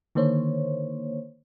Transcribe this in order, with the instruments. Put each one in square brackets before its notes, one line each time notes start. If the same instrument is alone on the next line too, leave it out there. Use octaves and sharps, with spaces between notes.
[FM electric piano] D3 D#3 A#3 C5 C#5